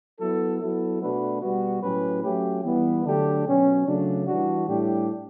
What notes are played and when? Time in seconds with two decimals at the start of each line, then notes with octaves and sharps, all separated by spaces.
0.20 F#3 B3 E4 A4
0.61 F#3 B3 E4 A4
1.01 B2 A3 D4 F#4 B4
1.42 B2 G3 B3 F#4
1.82 A2 F#3 C#4 G4 B4
2.23 F#3 A3 C#4 G4
2.64 E3 G3 B3
3.05 D3 F#3 A3 D4 G4
3.46 B2 F#3 C#4
3.87 C#3 F#3 A3 D4
4.27 E3 G3 D4 F#4
4.68 A2 G3 D4 G4